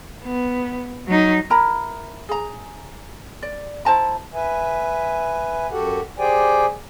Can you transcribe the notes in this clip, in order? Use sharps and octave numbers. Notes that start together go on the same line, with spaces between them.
B3
F#3 D#4
E4 A#4 A#5 B5
G#4 A#5
D5
E4 C5 A5 A#5
B4 E5 G#5
F#2 F#4 G4 A4 F#5
G4 G#4 C5 D5 G5 G#5